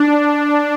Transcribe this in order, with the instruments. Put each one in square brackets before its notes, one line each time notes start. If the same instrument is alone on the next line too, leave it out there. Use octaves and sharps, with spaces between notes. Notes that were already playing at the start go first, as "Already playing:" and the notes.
Already playing: [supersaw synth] D4